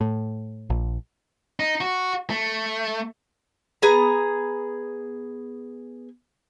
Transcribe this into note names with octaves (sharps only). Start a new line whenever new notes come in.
A2
A#1
D#4
F#4
A3
B3 G#4 A#5